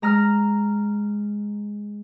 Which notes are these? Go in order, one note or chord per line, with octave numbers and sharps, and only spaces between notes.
G#3 A#5 D#6 F6